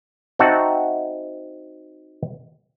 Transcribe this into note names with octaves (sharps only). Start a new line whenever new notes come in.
C4 D#4 F#4 E5 F#5 A5